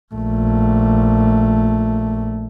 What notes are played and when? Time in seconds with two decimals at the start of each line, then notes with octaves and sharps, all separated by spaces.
0.15 A#1 A3